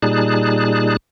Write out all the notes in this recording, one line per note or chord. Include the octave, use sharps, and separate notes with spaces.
A#2 G3 D#4 G#4 A5 F#6